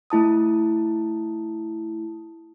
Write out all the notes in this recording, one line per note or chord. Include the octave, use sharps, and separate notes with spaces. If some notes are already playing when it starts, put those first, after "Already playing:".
A3 E4 A5 D#6